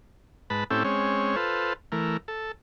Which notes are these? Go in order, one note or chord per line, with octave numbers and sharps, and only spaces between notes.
G#2 B4 A5 B5
A2 C4 C#4 E4 G4 A4
G#3 C4 C#4 C#5
F4 A4 B4 C5
E3 A3 A#4
A4